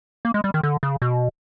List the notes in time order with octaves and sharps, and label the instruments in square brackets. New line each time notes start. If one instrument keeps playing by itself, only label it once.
[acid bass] A#3
G#3
G3
D#3
D3
C#3
B2